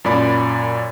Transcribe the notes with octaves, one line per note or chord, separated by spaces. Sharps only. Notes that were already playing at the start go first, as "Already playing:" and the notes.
F#2 A#2 D5 B5